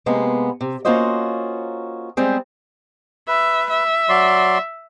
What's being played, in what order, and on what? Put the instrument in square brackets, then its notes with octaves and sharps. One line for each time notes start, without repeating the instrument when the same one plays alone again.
[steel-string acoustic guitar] C3 G#3 A#3 B3
C3
A#3 C#4 F4 F#4 C5 D#5
G3 G#3 C4 G#4
[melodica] B4 [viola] E5
[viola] E5
[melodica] F#3 D5 C6